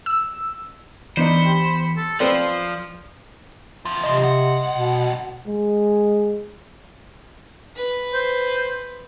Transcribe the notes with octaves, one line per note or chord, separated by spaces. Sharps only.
E6
E3 B3 D4 D#4 C5 B5 C#7
G4
A4
F3 C4 A4 B4 D5 C6
E2 F3
C3 D#5 C6
C2 F#5
B2
G#3
B4
C5